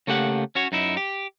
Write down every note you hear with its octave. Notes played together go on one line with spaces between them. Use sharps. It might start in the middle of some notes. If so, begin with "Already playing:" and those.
C#3 A3 A#3 G4 F#5
C#4 F#4 C#5
F#2 D#4 E4
G4